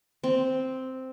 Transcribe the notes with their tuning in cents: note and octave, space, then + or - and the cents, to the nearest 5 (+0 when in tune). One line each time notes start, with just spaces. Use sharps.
C4 -5